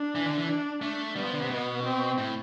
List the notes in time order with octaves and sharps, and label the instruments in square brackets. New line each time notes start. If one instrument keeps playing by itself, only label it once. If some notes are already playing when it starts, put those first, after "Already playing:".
Already playing: [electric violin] D4
[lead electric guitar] E3
D3
E3
[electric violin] D4
[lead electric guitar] A3 [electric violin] D4
[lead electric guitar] G3 [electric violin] B3
[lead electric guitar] F3
D3
C3
B2
[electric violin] C4
[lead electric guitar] A2